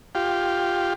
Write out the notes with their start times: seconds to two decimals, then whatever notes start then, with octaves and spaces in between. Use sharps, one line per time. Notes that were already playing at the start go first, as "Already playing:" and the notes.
0.15 F4 G4